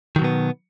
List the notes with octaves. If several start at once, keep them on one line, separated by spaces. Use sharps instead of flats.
B2 D#3 F#3 B3